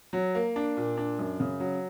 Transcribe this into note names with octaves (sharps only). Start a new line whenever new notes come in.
F#3
A#3
D4
A#2
D4
F#2
C#3
F#3